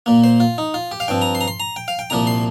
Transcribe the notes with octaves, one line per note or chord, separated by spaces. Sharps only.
A#2 A#3
C5
F4
D#4
F4
G4
F5
G2 F3 C4 G5
A#5
C6
A#5
C6
A#5
G5
F5
G5
C2 A#2 F3 A#3 A#5
C6